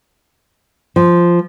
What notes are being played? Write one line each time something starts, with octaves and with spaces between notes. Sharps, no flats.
F3